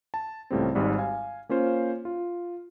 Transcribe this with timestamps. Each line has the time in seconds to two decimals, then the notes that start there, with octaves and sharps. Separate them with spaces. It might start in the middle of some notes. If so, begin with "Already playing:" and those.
0.14 A5
0.51 C#2 A2 G3 C4
0.75 G#1 G#2 G3 G#3
0.98 F5 G#5
1.49 A#3 C#4 F4 C5
2.05 F4